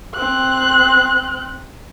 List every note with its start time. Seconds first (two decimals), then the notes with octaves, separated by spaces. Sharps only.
0.14 C4 F#6